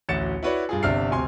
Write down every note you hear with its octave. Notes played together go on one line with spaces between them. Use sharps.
A1 D2 F#4 A6 C#7 E7
E4 F#4 B4 C#5 D5
G2 F4 G#4
G1 C3 D4 E5 F6 C7
D1 C3 G#5 C6